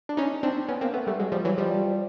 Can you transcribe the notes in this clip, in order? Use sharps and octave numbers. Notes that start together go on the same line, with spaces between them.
D4
C#4 D#4
C4 D4
B3 C#4
A#3 C4
A3 B3
G3 A3
F#3 G#3
F3 G3
E3 F#3
F3 G3